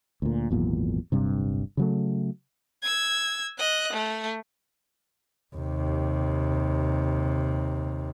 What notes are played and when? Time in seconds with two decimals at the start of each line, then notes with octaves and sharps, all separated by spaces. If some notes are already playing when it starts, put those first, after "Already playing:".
0.22 D2 A#2
0.50 G#1 E2 A#2 F#3
1.12 D1 G1 G2 C3
1.77 C#3 F#3 A3
2.82 E6 G#6
3.58 D#5 F#6
3.93 A3
5.56 D#2 C3